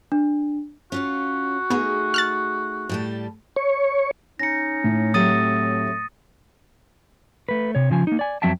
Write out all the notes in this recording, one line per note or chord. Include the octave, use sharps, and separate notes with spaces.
D4
C#4 F4 F#4 C#5
A3 B3 D#4 G#4
F6 F#6 A6
A2 G3 A5
C#5
C#4 D#4 A#6 C#7
A2
F#3 A3 C4 G4 C#5 D#6 A6 D#7
A3 B4
C3 C#5
C#3 F3 G#5
A#3 D#4
D5 G#5
F2 F#3 C4 E5 G5 A5